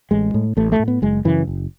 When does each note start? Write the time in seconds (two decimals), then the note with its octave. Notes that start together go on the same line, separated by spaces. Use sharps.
0.11 A1 G#3
0.34 A2
0.57 A1 A3
0.72 A3
0.80 A2
0.88 B3
1.02 F#1 G#3
1.25 F#2 C#3 E3
1.47 F#1